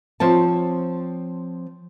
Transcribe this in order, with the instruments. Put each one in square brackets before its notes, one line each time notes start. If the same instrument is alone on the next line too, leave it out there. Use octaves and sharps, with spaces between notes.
[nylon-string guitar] F3 C4 C#5 A5